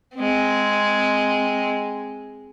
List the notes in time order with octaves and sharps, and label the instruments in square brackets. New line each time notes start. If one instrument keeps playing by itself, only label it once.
[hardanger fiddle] G#3 C4